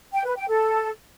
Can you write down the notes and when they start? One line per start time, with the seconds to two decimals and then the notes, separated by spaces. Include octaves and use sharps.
0.13 G5
0.25 B4
0.37 G5
0.49 A4